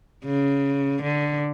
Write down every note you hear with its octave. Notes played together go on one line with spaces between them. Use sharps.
C#3
D3